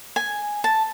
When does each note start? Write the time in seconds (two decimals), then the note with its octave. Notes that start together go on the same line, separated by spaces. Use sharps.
0.16 G#5
0.64 A5